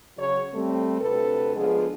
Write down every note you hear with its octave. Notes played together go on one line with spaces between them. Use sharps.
C#3 F#3 C#5
G3 A3 C4
D2 C3 A4 B4
D3 F3 G#3 B3 F4 G#4